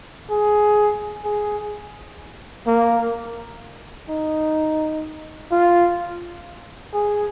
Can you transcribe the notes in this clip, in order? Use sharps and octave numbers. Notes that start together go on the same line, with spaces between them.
G#4
G#4
A#3
D#4
F4
G#4